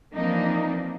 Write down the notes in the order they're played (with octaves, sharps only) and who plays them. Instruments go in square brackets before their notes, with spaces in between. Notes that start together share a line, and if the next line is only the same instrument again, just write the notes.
[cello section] E3 F3 A#3 C4 D4 D#4